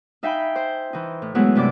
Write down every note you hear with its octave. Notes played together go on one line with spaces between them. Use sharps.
D#4 E5 F5 G5 G#5 B5
C5
E3 D#4
A2
E3 F#3 G#3 A3 B3 E4
G2 C3 D5 D6